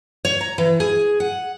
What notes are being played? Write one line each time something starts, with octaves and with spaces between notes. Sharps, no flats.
C#5
A#5
E3
G#4
F#5